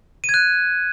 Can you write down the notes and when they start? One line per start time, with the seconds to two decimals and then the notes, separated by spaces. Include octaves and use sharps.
0.24 D#7
0.29 G#6
0.34 F#6